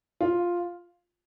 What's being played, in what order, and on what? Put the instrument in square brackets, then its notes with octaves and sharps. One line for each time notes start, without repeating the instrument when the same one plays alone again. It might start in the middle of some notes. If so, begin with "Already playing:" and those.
[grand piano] F4